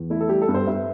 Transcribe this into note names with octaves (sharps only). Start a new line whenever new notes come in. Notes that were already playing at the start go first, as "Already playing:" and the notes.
Already playing: E2
A3 E4
A4
G3 G4
A4
G2
C5
G2 E5